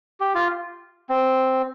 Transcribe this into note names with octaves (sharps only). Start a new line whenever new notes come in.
G4
F4
C4